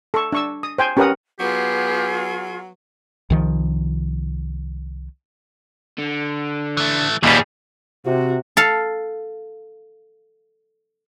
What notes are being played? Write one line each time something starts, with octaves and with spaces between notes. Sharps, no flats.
A4 C#6
D4 C#6 E6
D#6
C5 G5 G#5
C#4 G4 A#4 B4 F#5 D#6
F#3 B3 F4 G4 G#4
C2 D#3 F3
D3
E3 A3
D#2 A2 G3 B3 G#4
C3 F#4
A4 F5